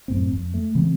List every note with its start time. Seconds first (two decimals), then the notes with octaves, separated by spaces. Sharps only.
0.08 F#2 A2 C4
0.33 F2
0.54 A3
0.75 C#3 E3 G#3 C4